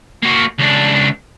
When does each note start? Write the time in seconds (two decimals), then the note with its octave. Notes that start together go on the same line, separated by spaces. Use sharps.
0.23 A#3 F#4
0.59 C#2 D4